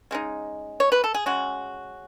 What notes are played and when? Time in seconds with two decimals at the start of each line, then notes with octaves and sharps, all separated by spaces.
0.11 C#3 G#3 D#4
0.80 C#5
0.92 B4
1.04 A4
1.14 G#4
1.26 C#3 G#3 C#4 F#4